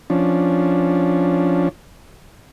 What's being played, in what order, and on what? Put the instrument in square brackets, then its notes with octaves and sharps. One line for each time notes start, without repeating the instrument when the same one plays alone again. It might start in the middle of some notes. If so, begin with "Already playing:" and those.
[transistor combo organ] F3 C#4 D4